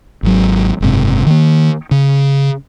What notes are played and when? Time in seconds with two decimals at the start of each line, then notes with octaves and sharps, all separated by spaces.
0.23 G#1 F#3
0.81 F#1 G#2 C3
1.26 D#3 A#3
1.91 C#3